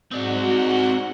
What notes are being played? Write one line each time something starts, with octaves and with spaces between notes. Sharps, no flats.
G#2 C4 F#4 D5 F#5